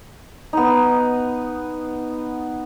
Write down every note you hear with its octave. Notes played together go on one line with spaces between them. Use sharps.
B3 D#4